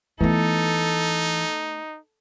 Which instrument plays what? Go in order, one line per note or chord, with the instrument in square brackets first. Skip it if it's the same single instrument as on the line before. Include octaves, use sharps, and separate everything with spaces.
[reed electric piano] E3 [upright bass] A3 B3 [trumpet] D#4 [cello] A4